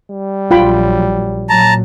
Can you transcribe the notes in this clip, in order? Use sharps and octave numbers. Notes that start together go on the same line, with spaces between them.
G3
A#1 F#3 F4 G5 B5
A#2 F#3 A5 A#5